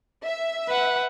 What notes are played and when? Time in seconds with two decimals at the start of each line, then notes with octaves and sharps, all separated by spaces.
0.25 E5
0.68 B4 F#5